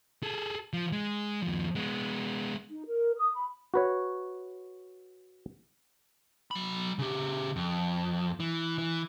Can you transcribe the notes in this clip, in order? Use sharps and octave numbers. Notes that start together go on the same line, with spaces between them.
G#4 A4
F3
G#3
D#2 F3
G#3 B3
D#4
A#4
D#6
B5
F#4 B4 C#5
F#3 B5
C#3 G4
F2
E3
E3